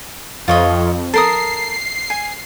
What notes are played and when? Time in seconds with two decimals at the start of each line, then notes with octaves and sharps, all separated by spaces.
0.48 F2 F4 C#5 D#5
1.14 A4 A#4 D#6 C7
2.10 G#5